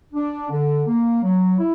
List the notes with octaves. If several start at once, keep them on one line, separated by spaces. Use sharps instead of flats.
D4
D3
A#3
F#3
E4